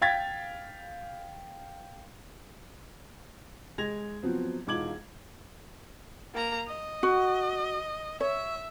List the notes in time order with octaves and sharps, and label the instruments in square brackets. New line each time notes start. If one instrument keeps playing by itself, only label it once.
[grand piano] F5 G5 G#6 A6 B6
[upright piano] G#3 G#6 A#6 F7
F3 F#3 B3 C4
E1 D#4 F4 D6 G#6 F#7
[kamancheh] A#3 A#5
D#5
[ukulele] F#4
[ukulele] C#5 [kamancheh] E5